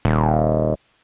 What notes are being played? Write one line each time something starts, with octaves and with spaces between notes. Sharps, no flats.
D#1